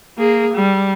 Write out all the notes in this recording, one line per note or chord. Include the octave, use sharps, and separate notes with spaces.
A#3 G#4
G3